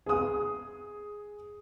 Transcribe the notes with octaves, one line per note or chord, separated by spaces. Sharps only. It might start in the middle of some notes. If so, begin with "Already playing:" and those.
G#4 D#6